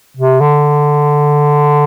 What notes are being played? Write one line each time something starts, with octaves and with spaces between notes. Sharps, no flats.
C3
D3